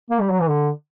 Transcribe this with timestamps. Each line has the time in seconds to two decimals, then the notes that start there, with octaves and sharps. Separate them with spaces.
0.10 A#3
0.21 G3
0.31 F#3
0.41 E3
0.49 D3